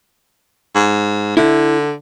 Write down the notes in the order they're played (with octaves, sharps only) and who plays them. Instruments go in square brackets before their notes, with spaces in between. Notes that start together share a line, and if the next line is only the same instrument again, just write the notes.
[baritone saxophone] G#2
[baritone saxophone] D3 [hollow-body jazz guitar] E4